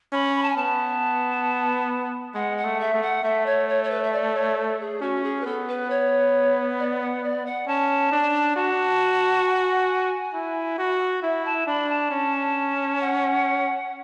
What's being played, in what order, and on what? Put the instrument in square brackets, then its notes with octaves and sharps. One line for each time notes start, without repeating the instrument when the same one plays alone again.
[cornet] C#4 [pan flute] B5
[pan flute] B5
A5
G#5
[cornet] B3 [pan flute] A5
[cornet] G#3 [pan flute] F#5
[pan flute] F#5
[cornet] A3
[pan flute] E5
[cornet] A3
[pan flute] F#5
[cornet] A3 [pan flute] E5
[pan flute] C#5
C#5
C#5
B4
E5
D5
C#5
A4
G#4
[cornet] C#4 [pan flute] F#4
[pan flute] G#4
B4
[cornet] B3 [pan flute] A4
[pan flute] B4
C#5
D5
F#5
D5
F#5
[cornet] C#4 [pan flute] A5
[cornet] D4
[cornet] F#4 [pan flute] A5
[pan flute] G#5
[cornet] E4
F#4
[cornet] E4 [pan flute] E5
[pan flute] A5
[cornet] D4 [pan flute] B5
[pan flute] A5
[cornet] C#4
[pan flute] F#5